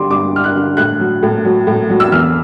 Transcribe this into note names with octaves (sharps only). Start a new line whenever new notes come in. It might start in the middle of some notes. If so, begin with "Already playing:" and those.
Already playing: G2 D3 G3 C6 D6
G2 D6
G2 F6
F#6
D3
A2 F#6
F#3
A2
F#3
A2
F#3
E6
E2 F6